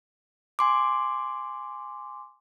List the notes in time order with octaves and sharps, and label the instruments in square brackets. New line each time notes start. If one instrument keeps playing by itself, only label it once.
[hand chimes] G#5 C6 D6